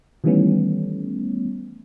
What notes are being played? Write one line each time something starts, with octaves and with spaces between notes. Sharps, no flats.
D#3 E3 G3 A3 B3 C#4